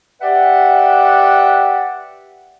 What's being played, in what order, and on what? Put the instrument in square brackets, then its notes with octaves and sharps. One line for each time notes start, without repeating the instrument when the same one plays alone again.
[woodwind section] G4 B4 D5 E5 F#5 G5